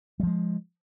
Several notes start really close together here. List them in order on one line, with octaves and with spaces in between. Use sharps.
G3 F3 G#3